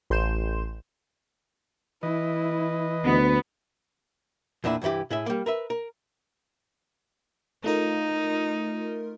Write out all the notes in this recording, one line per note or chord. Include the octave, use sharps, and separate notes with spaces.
A1 C6 G6 E7
E3 E4 B4 D#5
D2 B3
E2 A#2 D4 E4
C2 G2 E3 E4 G4
A2 E4 G#4 E5
G3 A#3
A#4 B4 E5
A#4
A3 D#4 F4 A#4